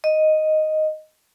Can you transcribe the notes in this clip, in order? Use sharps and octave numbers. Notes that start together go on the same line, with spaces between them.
D#5